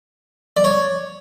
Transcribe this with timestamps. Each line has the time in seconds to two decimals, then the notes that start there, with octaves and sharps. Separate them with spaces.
0.57 D5
0.64 C#5